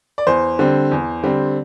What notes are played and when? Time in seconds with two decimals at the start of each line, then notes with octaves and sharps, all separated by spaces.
0.18 D5
0.27 E2 C5
0.59 D3 G3 C4
0.92 E2
1.23 D3 G3 C4